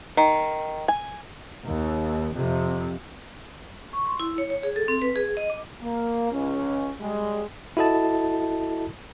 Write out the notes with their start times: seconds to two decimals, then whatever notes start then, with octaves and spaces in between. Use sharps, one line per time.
0.17 D#3
0.88 G#5
1.64 D#2
2.33 F2 C3
3.93 C#6
4.07 C6
4.20 E4
4.38 C#5
4.50 C#5
4.63 G#4
4.76 A4
4.88 C4
5.02 B4
5.16 G#4
5.37 D#5
5.50 D6
5.83 A#3
6.32 C#2 C#4
7.00 G3 G#3
7.77 E4 F#4 A4 D#5 A5